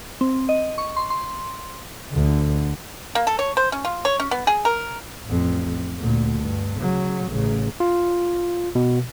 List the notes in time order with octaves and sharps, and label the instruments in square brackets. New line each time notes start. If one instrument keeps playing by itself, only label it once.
[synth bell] C4
D#5
C#6
C6
C6
[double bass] D2 D3
[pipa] A#3
A4
C#5
C5
C#4
F4
C#5
C#4
B3
G#4
A#4
[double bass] A1 F2
D2 A#2
G2
C#3 F#3
A1 C#3
[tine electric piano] F4
B2